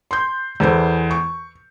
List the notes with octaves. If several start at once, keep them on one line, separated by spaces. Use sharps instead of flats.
C6 G6
E2 E3 A4 C5
C#6